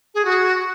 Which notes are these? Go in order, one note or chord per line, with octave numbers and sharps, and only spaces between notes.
G#4
F#4